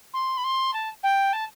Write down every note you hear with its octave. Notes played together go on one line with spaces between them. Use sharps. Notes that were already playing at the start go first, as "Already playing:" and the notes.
C6
B5
C6
A5
G5
A5